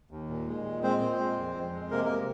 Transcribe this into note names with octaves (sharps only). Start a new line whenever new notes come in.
D#2
A#2
G#3
A#2
G#3 C4 C5
A#2
G#3
F2
F2
G#3
C3 A#3 A#4
A#3 A#4